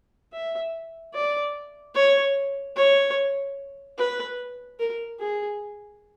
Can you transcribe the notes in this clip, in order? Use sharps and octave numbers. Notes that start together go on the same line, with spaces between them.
E5
D5
C#5
C#5
B4
A#4
G#4